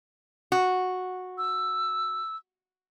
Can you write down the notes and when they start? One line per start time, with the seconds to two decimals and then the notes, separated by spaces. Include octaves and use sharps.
0.52 F#4
1.38 E6